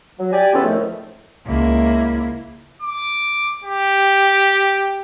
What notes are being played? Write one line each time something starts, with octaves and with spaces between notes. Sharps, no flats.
F#3
G4 D5 G#5
C#3 E3 B3 C#4 F4 A4
A2 D#3 F3 A3
C#2 A#3 E4
D6
G4